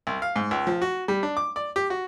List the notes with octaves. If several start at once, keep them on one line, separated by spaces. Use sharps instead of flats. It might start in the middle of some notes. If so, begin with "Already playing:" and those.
C2
F5
G#2
C#2
F3
F#4
G3
D4
D6
D5
G4
F#4